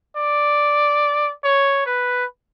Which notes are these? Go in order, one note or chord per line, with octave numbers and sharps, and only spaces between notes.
D5
C#5
B4